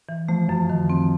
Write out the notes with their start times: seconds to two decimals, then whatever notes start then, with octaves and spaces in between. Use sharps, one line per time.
0.09 E3
0.29 F3 A3
0.48 F#2 F3
0.70 D#3
0.90 C4